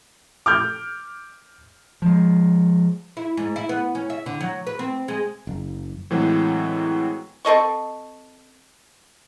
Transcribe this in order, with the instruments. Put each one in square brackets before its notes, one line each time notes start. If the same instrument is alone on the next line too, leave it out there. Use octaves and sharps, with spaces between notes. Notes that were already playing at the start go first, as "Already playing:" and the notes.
[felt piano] D6 F6 G6
[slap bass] F3 G#3
[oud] E4
G#2
E4
B3
C#4
E5
D3
F#3
B4
C4
G#3
[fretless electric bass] F#1
[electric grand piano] A2 E3 F#3 G#3 C4
[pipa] C4 A4 D#5 C#6